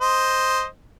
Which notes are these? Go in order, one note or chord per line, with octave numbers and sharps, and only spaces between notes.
C5 D#5